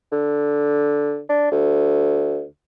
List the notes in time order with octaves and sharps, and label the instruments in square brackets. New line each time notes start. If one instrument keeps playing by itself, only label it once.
[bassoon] D3
D4
D2